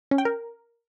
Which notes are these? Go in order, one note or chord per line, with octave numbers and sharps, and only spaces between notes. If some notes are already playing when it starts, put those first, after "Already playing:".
C#4
G5
A#4